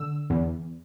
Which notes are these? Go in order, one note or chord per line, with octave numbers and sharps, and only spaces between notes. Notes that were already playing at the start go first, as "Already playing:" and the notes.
Already playing: D3 E6
E2